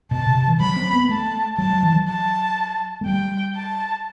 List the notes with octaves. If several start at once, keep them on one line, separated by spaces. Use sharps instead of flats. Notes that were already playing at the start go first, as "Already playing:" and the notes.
B2 A5
C3
C3
E3
F#3 B5
C4
B3
A3 A5
F#3 A5
F#3
E3
F#3
A5
A3
G3 G5
A5